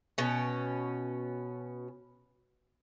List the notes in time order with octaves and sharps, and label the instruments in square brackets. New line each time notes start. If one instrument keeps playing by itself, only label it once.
[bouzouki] B2 C#4